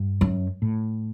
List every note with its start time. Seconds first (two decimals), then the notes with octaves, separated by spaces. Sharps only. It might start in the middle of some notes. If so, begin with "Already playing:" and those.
Already playing: G2
0.21 F#2
0.62 A2